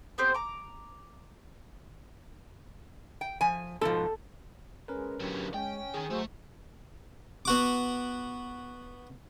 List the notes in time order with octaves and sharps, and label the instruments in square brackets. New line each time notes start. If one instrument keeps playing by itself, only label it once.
[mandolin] B3 C4 G4 C5
A#5 D6
[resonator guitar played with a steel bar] G5
F3 G#5
[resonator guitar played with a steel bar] G#2 B2 F3 [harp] A4
[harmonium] G#3 [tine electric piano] C#4 A#4 B4
[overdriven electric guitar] D3 F#3 [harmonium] G4
[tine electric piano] G#3 [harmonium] C#4 [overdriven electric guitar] G5
[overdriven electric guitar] D#3 [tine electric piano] G#4 G#5
[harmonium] F#3 F#4 C5 [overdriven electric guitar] A3
[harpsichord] B3 F#4 D6